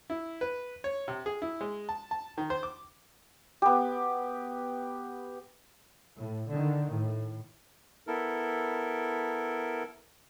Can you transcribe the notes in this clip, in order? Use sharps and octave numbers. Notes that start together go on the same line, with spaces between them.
E4
B4
C#5
C3
G#4
E4
G#3
A5
A5
D#3
C5
D6
B3 G4
A2
D3 D#3
A2
B3 E4 A4 A#4